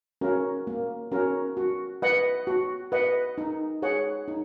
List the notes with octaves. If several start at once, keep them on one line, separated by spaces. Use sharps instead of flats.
C#4 F#4 A#4
A#3
C#4 F#4 A#4
F#4
B4 D#5 F#5
F#4
B4 D#5 F#5
D#4
G#4 C#5 F#5
D#4